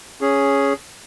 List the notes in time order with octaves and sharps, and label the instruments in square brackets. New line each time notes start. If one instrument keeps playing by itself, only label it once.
[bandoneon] C#4 G#4